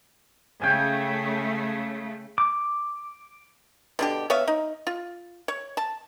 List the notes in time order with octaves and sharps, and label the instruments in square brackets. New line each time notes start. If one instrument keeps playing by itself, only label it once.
[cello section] C#3 A3 [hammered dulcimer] G5 G#5
[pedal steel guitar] D6
[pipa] B2 D3 G4
B3 C#5 E5 F5
D#4
F4
C#5
A5